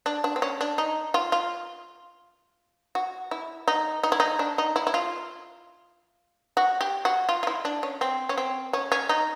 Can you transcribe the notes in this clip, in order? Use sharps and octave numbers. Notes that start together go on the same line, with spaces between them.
D4
D4
C4
C#4
D4
D#4
F4
F4
F#4
E4
D#4
D#4
E4
D#4
D4
D#4
E4
E4
F4
F#4
G4
F#4
F4
F4
E4
D4
C#4
C4
C#4
C4
C#4
C#4
D#4